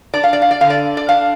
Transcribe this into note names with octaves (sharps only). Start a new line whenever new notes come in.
D4 D5
F5
D5
F5
D5
D3 F5
D5
D5
D4 F5